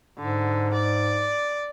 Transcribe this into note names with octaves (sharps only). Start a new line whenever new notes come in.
G#2 D3
D5